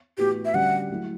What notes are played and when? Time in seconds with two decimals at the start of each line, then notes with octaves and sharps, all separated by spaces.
0.18 A2 E3 B3 F#4 G4
0.45 E5
0.54 D3 G3 C#4 F#4 F#5
0.90 F#3 A3 E4